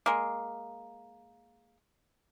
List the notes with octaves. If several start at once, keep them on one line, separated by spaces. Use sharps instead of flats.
G#3 A#3